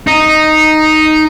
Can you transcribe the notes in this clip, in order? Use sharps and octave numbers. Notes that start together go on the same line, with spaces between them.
D#4